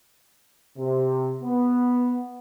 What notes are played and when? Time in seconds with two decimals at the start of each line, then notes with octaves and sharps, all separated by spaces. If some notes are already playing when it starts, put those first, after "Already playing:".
0.77 C3
1.42 B3